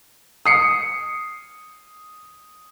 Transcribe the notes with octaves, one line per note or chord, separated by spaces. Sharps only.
D#6 C7 C#7